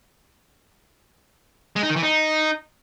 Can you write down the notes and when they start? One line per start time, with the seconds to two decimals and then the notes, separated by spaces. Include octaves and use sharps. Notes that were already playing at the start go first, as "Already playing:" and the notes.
1.76 G#3
1.83 D#4
1.89 D#3
1.96 E3
2.03 D#4